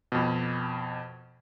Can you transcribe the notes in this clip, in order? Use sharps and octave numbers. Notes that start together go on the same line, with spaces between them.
F2 B2